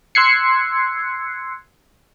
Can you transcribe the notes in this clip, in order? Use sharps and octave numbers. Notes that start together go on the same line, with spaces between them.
C6 E6 F#6 G#6 C7 C#7